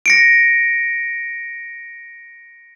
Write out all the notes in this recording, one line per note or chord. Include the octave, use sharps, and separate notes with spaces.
A#6 C#7 D7